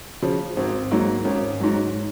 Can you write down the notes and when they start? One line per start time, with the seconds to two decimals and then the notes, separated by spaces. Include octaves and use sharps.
0.22 C#3 F3
0.57 G#1 C4
0.91 G#2 F#3 A#3
1.25 G#1 C#4
1.60 G#2 F#3